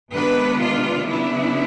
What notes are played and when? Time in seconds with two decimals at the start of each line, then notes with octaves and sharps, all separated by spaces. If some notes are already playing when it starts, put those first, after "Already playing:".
0.12 C3 D#3 G#3 B3 D4 B4
0.59 F4
1.06 C#3 F#3 B3 D4 E4